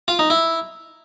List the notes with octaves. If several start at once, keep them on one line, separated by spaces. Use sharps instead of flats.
F4
D#4
E4